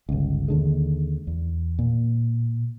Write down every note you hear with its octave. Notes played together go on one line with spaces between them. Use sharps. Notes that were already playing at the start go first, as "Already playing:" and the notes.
G1 C#2
D#2 D3 G#3
E2
A#2